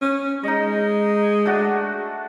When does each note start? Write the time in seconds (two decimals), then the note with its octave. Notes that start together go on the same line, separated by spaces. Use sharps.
0.02 C#4
0.43 G#3 D#4 D#5
1.45 A3 D4 F#4